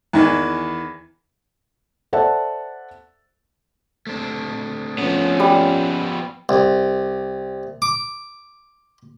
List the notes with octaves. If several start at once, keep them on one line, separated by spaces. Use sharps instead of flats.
E2 D#3 E3
A4 C5 D5 E5 F#5 A5
A3 C4 D4
F3 B3 C#4 B4
G3
C2
D6